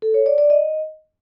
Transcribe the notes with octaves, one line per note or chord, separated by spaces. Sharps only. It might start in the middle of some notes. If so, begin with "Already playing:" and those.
A4
C#5
D5
D5
D#5